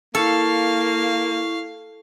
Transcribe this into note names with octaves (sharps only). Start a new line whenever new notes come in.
A#3 E4 A4 F5 C#6